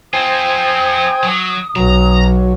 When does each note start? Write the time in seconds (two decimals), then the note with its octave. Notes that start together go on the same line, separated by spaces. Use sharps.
0.13 C4 F4 C5 G5 G#5 D#6
1.23 F#3
1.76 B1 F#3 A#5